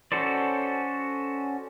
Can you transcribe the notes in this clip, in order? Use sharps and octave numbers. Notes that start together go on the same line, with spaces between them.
C#4 F#4 A4 C5 D5